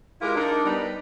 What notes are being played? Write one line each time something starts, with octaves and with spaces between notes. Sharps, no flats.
G#3 E4 F4 G4 A#4
D4 D#4 A#4
G3 B3 D4 D#4 B4 D5